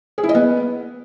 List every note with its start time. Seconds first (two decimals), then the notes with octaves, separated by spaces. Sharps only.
0.18 G#4
0.23 E4
0.29 D#5
0.35 B3